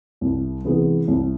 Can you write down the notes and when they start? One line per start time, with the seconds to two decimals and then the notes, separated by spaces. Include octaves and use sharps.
0.21 C2
0.65 C3 E3 G#3 B3
1.08 C2